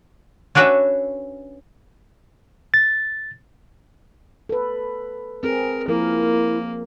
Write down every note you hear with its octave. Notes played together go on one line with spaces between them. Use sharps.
C#4 D4 F#4 B4 E5
A6
A4 B4
C4 G#4 A#4
F3 A#3 E4 A#4